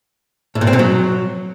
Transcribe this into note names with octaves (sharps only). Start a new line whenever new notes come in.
A2
A#2
C4
B2
F#3